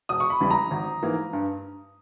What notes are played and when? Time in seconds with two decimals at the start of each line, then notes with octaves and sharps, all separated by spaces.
0.09 E1 D#6
0.20 C#6
0.30 B5
0.41 E2 C#3 G3 B5
0.51 A#5
0.71 G#1
1.03 G#2 E3 A#3
1.33 G2